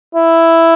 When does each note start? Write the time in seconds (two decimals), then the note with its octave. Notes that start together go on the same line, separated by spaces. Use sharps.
0.15 E4